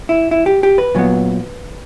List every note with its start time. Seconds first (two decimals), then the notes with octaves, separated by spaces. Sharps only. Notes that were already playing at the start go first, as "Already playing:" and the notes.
0.09 E4
0.31 E4
0.46 G4
0.63 G4
0.78 B4
0.95 A#2 F#3 B3